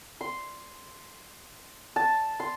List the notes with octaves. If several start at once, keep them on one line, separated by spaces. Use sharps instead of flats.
C6
A5
C6